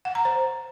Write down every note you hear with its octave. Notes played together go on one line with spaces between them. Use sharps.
F#5
A#5
C5